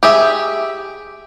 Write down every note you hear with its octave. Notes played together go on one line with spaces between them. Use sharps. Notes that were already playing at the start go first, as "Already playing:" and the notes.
G4 G#4 E5